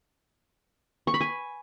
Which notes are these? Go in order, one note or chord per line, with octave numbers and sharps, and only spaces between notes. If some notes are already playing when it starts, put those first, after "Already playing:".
C#6
B5
G#5